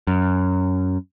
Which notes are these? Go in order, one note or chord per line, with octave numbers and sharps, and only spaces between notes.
F#2